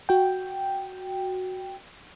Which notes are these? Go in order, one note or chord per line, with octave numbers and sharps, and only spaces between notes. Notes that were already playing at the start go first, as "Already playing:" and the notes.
F#4 G5